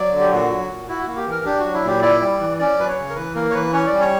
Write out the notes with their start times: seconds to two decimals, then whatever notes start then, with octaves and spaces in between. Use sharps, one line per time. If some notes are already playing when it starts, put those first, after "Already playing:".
Already playing: F#3 D5
0.12 D3
0.20 G4
0.32 A#2 F#4
0.50 F#3
0.70 A#2
0.88 E4 F#4
1.03 A#3 F#4
1.17 G4
1.26 E3
1.32 A#4
1.45 D4 G4
1.60 F#4
1.65 F#3
1.74 E4
1.83 A#2 G4
2.02 E4 D5
2.21 G3
2.40 E3
2.59 C#4 D5
2.78 F#3 B4
2.88 C#5
2.97 C#3
3.10 A#4
3.16 E3 B4
3.35 A#3 A#4
3.50 C#5
3.54 E3 B4
3.73 C#4 C#5
3.87 D5
3.92 G3
4.01 C#5